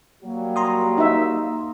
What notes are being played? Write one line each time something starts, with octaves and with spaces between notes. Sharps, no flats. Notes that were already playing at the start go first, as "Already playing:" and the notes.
F#3 G3 A#3
A#5 C6 D#6
D#4 E5